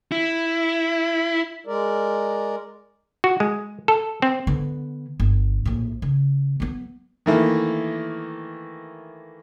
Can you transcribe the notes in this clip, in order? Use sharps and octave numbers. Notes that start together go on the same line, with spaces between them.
E4
G#3 A#4 D5
F#4
G#3
A4
C4
D3 B3
G1
A#1 A2
C#3
F#3 B3
D#3 E3 A3 A#3